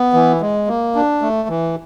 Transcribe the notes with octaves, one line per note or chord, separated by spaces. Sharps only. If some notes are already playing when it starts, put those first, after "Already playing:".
Already playing: B3
E3
G#3
A#3
D4
A3
E3